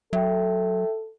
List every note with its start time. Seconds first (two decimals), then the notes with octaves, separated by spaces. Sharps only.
0.13 F#3 A4 E5 G5